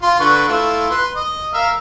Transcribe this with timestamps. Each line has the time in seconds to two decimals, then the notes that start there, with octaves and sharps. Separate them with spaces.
0.02 F4 C6
0.20 D3 B4 C#6
0.48 A3 E4 F4
0.90 B4 C6
1.16 D#5
1.54 A#4 E5 F5